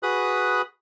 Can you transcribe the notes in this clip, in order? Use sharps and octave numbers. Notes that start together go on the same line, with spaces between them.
F#4 G#4 B4 B5 D#6 F#6